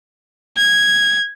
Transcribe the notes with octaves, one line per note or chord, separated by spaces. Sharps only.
G#6